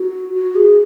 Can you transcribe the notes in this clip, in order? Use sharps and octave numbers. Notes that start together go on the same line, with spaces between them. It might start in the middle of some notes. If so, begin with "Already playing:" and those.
Already playing: F#4
F#4
G#4